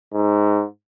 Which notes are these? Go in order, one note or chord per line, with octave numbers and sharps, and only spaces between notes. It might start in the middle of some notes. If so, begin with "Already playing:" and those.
G#2